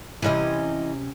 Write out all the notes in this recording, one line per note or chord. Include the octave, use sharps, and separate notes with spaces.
C3 E3 C#4 B4 D#5